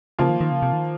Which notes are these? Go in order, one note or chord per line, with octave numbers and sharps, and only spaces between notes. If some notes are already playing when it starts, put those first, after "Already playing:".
C#3 F3 A#3 F4
D#3
D#3
C#3
C3
D#3